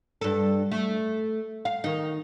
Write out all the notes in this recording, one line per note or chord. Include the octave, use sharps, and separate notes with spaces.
G2 A4
A3
F5
D#3 D#4